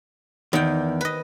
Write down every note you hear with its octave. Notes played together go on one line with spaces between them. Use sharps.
E2 D#3 G5
B4 D#5